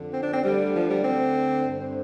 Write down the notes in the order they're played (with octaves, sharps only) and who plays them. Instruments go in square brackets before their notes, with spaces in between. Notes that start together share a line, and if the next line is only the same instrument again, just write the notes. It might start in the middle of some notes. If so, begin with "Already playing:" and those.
Already playing: [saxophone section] F2 D3
C4
D4
C4
D2 D3 G3
F3
G3
C4
G2 D3
C4